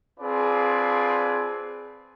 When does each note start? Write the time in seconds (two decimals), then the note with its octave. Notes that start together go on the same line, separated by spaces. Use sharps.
0.20 C4 D4 F4 G#4 B4 D5